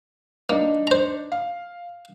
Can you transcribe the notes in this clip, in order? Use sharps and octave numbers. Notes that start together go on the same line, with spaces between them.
A#3 D4 D#4
C5 A#5
F5